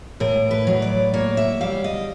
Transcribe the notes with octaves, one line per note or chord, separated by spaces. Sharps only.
A2 A#4
B4
F#3
D5
A#3 C#5
E5
G3 F5
D#5